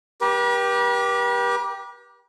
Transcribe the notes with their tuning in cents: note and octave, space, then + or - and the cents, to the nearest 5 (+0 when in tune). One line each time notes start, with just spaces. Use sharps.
G4 +0 B4 -45